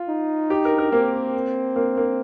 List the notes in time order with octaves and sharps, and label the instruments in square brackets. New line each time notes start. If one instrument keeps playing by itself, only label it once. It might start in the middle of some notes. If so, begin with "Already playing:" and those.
Already playing: [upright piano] F4
[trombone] D#4
[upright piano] G4
A#4
A#4
[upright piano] A#3 [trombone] C4
[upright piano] A#3
A#3